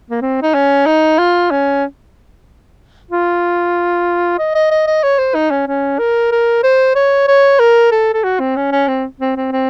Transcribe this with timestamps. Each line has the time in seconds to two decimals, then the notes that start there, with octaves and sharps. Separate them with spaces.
0.10 A#3
0.22 C4
0.42 D#4
0.54 C#4
0.86 D#4
1.18 F4
1.51 C#4
3.11 F4
4.39 D#5
4.55 D#5
4.71 D#5
4.87 D#5
5.03 C#5
5.19 C5
5.35 D#4
5.51 C#4
5.67 C#4
5.99 A#4
6.32 A#4
6.63 C5
6.95 C#5
7.28 C#5
7.59 A#4
7.91 A4
8.14 A4
8.23 F#4
8.40 C4
8.56 C#4
8.72 C#4
8.88 C4
9.20 C4
9.36 C4
9.52 C4